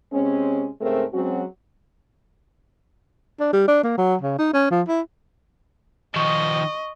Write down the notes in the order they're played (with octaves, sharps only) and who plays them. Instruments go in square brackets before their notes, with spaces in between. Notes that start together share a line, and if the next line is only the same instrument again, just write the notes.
[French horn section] C3 G#3 C4 C#4
G#2 C#3 A3 C4 G#4 A#4
F#3 G#3 C4 C#4 F#4
[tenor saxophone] D4
G3
D4
A#3
F#3
C#3
D#4
C#4
F3
E4
[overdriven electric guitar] D#3 F3 [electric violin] D#5 [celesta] C#6